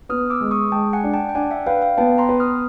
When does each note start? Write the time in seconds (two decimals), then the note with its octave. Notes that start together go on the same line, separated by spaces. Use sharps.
0.09 B3 D#6 F6
0.30 D6 E6
0.41 G#3
0.51 C#6 D#6
0.72 G#3 G5 A5
0.93 F#5 G#5
1.04 D4
1.14 G5 A5
1.29 G5
1.35 D4 F#5 G#5
1.51 E5 F#5
1.66 B4 F5 G5
1.81 F5 G5
1.98 B3 G5 A5
2.18 A#5 C6
2.29 B4
2.40 D#6 F6